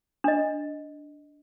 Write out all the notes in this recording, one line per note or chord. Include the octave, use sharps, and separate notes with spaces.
D4 D#5